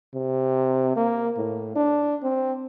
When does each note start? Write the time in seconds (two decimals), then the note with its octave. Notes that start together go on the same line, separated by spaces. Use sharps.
0.14 C3
0.96 A#3
1.38 A2
1.76 D4
2.23 C4